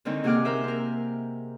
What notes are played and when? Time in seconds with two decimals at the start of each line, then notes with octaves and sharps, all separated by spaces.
0.05 D3 D#3 C4 C#4 D#4
0.24 C3 A#3 G#4 F#5 D6 F6
0.45 G#4 A#4 C5 E5
0.64 C4 A#4